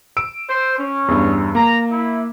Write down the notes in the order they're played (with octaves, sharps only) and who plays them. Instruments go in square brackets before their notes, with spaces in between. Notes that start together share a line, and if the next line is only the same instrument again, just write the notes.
[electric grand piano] E6 D7
[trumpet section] C5
C#4
[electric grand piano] E2 G2
[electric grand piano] A#3 [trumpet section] A#5
[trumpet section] E4